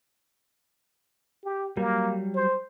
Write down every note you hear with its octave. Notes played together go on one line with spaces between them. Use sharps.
G4
F#3 G3 A#3
C5